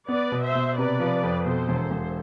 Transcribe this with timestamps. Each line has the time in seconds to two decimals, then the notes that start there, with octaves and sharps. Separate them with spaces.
0.08 B3 B4 D5
0.32 B2
0.44 C5 E5
0.55 B2
0.77 C3 B4 D5
1.00 F3
1.23 F2
1.45 B2 A4 C5
1.69 E1
1.91 E1